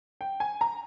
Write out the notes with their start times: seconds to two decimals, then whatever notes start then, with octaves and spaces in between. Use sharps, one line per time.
0.21 G5
0.40 G#5
0.61 A#5